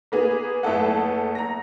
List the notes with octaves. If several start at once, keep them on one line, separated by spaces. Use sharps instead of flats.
A#3 B3 G#4
F#1 A3 B3 A4 F#5
A#5 A#6